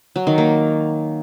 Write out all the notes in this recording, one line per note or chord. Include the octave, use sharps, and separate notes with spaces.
F#3
D#3
A#3